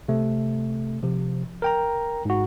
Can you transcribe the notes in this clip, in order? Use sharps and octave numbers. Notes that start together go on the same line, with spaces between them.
C3 A3
C3 F3
A#4 G5 A#5
G#2 F#4